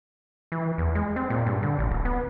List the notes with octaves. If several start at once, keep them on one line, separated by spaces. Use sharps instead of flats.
E3
E2
G#3
C4
A#2
G2
D3
A1
D1
B3